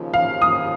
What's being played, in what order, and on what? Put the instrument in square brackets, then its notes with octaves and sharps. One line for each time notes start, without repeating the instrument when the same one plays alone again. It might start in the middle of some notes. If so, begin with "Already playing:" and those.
Already playing: [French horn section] D#2 C#3 F3
[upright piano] F5
D#6